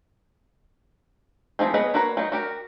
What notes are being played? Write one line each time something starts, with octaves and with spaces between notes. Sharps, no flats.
E3 F3 C4 G#4
F#3 B3 G#4 B4 D#5
A#3 F#4 B4 C#5 A#5
F#3 G3 D#4
F#4 G4 A#4